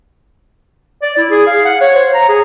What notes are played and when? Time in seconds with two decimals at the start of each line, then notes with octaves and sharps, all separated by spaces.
1.02 D5
1.17 E4
1.31 G#4
1.47 F5
1.66 F#5
1.81 C#5
1.95 C5
2.14 A#5
2.29 G#4